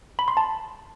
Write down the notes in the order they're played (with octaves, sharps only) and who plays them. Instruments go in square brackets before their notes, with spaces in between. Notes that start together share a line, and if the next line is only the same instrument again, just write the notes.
[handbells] B5
C6
A5